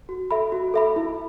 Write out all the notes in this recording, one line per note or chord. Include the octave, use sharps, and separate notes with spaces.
F#4
A4 E5 B5
F#4
A4 E5 B5
E4